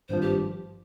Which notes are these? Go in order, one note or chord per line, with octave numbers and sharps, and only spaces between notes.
G#1 G2 F3 C5
G4